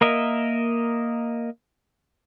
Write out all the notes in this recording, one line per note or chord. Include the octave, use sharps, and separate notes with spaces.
A#3 A#4 D#5 E5